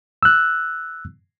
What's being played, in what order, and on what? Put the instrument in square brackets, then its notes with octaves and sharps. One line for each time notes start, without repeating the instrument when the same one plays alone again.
[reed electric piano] E6 F#6